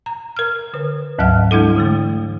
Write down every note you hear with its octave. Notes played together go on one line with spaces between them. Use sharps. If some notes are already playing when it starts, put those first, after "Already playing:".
A#5
A#4 F6
D3 B4
D2 G#2 F#3 E5 F#5 F6
G3 G#3 D4 E4 A4
D3 E3 A3